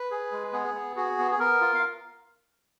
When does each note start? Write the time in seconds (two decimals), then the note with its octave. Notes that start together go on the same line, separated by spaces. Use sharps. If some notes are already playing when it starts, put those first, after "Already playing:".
Already playing: B4
0.11 G#4
0.32 G#3
0.53 B3 G#4
0.74 B3
0.96 F#4 G#4
1.19 B3
1.31 G#4
1.39 B3 A#4
1.61 F4
1.74 F5